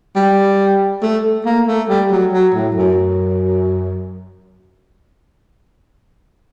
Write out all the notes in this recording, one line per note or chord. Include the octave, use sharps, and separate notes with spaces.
G3
A3
A#3
A3
G3
F#3
F#3
A2
F#2